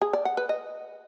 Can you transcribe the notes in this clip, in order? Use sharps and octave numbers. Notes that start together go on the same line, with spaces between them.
G#4
D5
F#5
B4
D#5